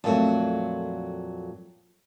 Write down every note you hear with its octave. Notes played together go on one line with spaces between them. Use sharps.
F2 A#2 D#3 F#3 A3